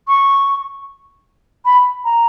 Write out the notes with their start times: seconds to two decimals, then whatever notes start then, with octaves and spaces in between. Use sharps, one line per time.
0.08 C#6
1.65 B5
2.05 A#5